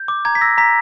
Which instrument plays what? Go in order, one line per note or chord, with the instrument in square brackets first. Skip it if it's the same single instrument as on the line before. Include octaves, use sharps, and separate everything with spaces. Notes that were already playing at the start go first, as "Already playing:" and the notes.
Already playing: [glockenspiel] G6
D6
A#5 G#6
B6
E6 A#6
A#5 B6